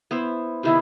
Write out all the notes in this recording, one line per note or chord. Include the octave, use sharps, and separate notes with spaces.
B3 E4 C5
C3 D#3 B3 E4